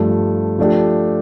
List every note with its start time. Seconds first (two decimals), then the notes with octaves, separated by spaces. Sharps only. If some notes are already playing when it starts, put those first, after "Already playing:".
Already playing: G2 F3 A3
0.58 F3 A3 D4 G4